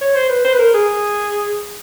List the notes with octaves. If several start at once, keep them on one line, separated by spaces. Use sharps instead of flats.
C#5
C5
B4
C5
B4
A#4
G#4